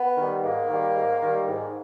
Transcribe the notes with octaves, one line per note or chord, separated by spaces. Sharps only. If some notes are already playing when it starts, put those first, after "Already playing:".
Already playing: B3
D#3 G3
G#2 A#3
D#3 G3
G#2
D#3 G3
G#2